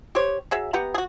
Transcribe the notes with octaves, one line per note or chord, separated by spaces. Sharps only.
G4 C5 C#5
F#3 G#4 E5
B3 G4 F#5 A#5
F#4 G#4